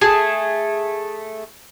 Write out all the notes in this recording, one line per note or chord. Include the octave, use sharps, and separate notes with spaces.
A3 G#4 A5